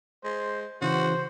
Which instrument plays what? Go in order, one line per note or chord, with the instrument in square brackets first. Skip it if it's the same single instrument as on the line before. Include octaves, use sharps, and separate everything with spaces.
[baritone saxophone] G#3 [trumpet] C5
[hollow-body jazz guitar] C#3 E3 [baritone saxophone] F#4 [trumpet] C5